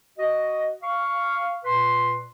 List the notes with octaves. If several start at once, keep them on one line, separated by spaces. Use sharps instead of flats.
F#4 D#5
F5 C#6
A#2 B4 C6